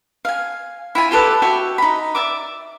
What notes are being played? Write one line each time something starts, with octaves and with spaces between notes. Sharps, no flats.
F5 G#5
E4 F4 G#5
F4 G4 A4 B4
F#4 G4 E5 G5
D#4 B5
D5 E5 D6